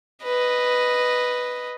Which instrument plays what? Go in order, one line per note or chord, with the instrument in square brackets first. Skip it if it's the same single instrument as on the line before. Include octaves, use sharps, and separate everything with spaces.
[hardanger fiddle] B4 D#5